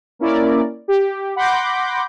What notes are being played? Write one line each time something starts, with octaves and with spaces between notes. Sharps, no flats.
A#3 C#4 E4 A#4 D5
G4
F#5 B5 C6 D6 G6 A#6